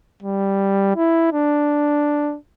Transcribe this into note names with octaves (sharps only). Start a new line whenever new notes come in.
G3
E4
D4